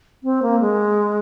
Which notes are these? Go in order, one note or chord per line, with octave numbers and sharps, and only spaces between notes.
C4
A#3
G#3